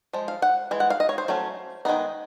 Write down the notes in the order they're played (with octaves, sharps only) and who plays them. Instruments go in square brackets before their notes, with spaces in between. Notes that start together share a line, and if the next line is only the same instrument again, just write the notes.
[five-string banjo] F3 G#3
F5
F#5
E3 G#3
F#5
F5
D#5
C#5
C5
F#3 A3 C#4
D#3 G#3 B3 D#4 D#5